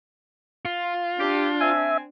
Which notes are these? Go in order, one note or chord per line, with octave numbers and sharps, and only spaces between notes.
F4
D4 G4
C4 E5 G#5